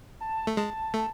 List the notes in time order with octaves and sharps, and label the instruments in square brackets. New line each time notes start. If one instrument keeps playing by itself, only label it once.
[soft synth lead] A5
[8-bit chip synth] A3
[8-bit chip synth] G#3 [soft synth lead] A5
[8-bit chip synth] A3